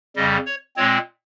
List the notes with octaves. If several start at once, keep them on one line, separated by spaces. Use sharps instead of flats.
F2 C#3 G3 D#5
C#5
A#2 G#3 C4 C#5